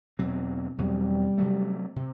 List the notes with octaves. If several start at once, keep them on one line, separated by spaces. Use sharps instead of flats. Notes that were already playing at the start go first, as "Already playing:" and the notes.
E2 B2 F#3 C4
E2 B2 F#3 G3 C4
C3 F#3 A3
C3